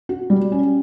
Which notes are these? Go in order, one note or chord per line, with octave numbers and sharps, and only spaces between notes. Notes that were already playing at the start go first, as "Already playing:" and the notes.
F#4
G3
C#4